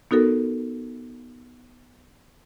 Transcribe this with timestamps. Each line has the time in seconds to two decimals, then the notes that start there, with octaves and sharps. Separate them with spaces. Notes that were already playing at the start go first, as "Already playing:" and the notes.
0.11 B3 D#4 F#4 A4 A#4